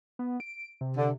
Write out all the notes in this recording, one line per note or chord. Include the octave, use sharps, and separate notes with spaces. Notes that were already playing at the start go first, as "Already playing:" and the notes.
B3
D7
C3
D3